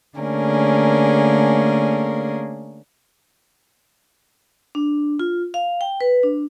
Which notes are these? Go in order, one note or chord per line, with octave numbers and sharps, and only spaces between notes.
D3 A3 A#3 C#4 G#4 A#4
D4
F4
F5
G5
B4
D4